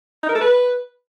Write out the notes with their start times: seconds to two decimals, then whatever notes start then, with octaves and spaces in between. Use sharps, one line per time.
0.23 D#4
0.29 A#4
0.35 A4
0.41 B4